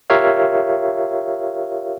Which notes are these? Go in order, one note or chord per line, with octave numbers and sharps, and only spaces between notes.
F4 G4 A#4 C#5 E5 F5